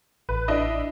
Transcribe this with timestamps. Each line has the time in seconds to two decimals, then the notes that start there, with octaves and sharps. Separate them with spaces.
0.29 A1 B4
0.48 D4 E4 D#5